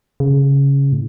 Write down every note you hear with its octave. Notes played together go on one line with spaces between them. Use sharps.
C#3
A2